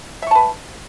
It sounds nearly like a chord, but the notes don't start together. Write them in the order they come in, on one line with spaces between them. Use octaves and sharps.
E5 C#6 A5 B4